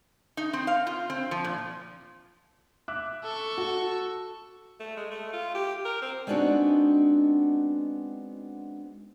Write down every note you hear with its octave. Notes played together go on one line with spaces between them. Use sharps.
D#4
C4
F5
F4
C4
F3
A#2
E5 D6 F#6
A4 C#6
F#4
A3
G#3
A3
F4
G4
A#4
C4
G#3 B3 C4 D4 D#4 F#4